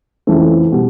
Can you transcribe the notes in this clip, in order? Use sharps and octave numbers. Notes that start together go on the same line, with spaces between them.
F2 C#3 E3 A3 C4
B2 G3